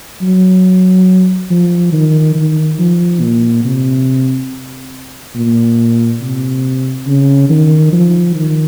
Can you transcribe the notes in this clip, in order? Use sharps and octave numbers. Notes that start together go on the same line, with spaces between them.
F#3
F3
D#3
D#3
F3
A#2
C3
A#2
C3
C#3
D#3
F3
D#3